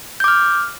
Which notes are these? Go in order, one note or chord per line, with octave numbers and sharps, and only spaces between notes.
D6 F6 G6